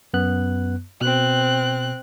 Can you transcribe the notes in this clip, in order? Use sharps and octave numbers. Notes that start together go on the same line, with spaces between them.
F#2 B3 F#6
B2 C4 F#6